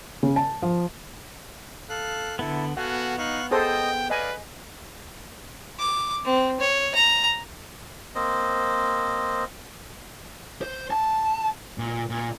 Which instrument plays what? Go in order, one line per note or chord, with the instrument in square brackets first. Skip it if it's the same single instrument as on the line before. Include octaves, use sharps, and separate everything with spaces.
[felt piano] C#3
A5
F3
[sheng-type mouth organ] A4 F5 F#6
[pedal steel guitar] D3 B3 [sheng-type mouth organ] E4 A4
[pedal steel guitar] B3 [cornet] F#4 [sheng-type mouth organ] A4 F5 G#5 [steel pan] F#5
[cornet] D#4 [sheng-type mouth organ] F5 C#6 F#6
[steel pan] G#4 A4 C5 [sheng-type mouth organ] D#5 D#6 [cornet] G5
[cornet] B4 [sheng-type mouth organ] D5 F5 [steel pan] D#5 G#5
[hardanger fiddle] D6
C4
C#5
A#5
[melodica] A#3 C4 C5 D#5
[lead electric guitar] C5
A5
A#2
A#2